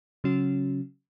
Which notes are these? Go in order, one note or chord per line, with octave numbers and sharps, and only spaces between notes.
C#3 F#3 C#4 F#4